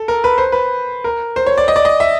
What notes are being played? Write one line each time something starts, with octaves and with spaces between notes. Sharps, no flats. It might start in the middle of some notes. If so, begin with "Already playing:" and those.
Already playing: A4
A#4
B4
C5
B4
A#4
C5
C#5
D5
D#5
D5
D#5
E5